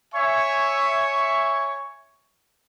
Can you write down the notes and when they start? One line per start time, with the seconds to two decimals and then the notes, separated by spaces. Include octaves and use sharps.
0.14 C#5 E5 G#5 C#6